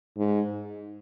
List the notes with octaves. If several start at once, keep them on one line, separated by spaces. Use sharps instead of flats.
G#2